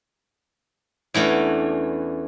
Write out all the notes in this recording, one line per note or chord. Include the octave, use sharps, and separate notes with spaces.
E2 E3 A3 C#4 D4